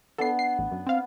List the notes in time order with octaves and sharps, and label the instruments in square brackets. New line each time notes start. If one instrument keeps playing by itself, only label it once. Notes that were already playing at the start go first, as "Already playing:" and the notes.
[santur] B3 D4 [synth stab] A4 C7
[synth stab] C7
A1
F#2
C4 F5